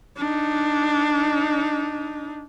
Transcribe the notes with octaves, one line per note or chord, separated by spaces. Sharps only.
D4 D#4